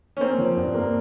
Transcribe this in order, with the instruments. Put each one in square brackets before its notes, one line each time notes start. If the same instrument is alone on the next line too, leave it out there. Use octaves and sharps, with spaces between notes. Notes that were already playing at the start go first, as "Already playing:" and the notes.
[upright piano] C#4
[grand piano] A#3 [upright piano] C4
[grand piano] F3
G2
A#3